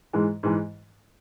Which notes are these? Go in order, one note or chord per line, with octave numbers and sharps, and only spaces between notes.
G#2 E3 G#3
G#2 E3 G#3